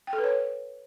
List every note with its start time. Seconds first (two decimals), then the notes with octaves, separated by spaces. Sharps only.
0.07 G5
0.13 A4
0.18 B4
0.24 C#5